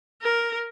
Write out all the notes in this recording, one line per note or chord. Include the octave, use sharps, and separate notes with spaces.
A#4